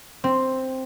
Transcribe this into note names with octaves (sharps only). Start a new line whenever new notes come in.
C4